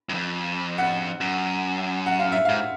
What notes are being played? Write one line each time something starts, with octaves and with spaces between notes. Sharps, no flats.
F#2
F2
F#5
F#2
F#5
F5
E5
G#2 F5